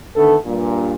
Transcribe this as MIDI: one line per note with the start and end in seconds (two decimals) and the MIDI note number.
0.16 0.34 50
0.16 0.34 51
0.16 0.34 57
0.16 0.34 59
0.16 0.34 69
0.45 0.95 43
0.45 0.95 46